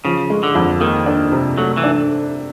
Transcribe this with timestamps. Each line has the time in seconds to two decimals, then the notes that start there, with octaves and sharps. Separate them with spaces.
0.05 C#3 F3
0.30 G#3
0.43 D3
0.55 F2
0.81 D#3 A#3
1.06 D4
1.32 C3
1.58 F#3 A3
1.77 E3
1.84 D4